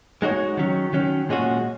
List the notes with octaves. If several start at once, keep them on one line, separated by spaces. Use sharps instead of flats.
G#3 D#4 F#4 C#5
D#3 F#3 C#4
D#3 F#3 C#4
A#2 G#3 C#4 F#4